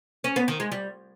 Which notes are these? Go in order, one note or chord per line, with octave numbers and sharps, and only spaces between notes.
C#4
B3
D#3
G#3
G3